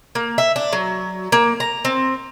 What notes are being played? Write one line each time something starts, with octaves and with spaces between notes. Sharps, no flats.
A#3
E5
D4
F#3
A#3
A#5
C4